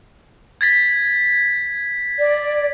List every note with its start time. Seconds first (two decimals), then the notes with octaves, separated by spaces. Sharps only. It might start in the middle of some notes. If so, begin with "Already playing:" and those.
0.61 G#6 A6 B6
2.19 D5